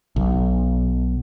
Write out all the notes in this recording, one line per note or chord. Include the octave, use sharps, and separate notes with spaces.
B1